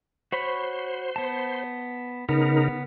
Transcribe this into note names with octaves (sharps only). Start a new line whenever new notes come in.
F#4 C5 C#5 B5
B3 A5
C#3 B3 D#4 A#4